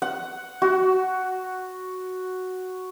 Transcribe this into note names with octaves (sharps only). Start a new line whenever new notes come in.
F#5
F#4